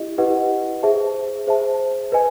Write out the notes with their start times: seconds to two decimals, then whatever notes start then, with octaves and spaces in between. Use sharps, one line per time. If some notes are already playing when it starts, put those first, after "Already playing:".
Already playing: E4 G4 D#5
0.18 E4 G4 B4 D#5 F#5
0.83 G#4 C5 E5 A5
1.47 G#4 C5 E5 A5
2.12 B4 D#5 G#5